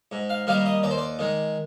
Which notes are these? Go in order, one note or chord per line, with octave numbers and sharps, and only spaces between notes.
G#2
F5
D#3 G3 A#3 F5
D#5
D#2 D5
C5
D5
D#3 G#3